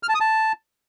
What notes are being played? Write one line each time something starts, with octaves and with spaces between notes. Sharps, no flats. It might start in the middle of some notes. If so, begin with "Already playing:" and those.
F6
A5
D#6
A5